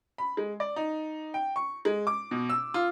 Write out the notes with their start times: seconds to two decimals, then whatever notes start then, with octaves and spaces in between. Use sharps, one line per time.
0.18 B5
0.37 G#3
0.60 D5
0.76 D#4
1.34 G5
1.56 C#6
1.85 G#3
2.07 D6
2.31 B2
2.50 E6
2.74 F4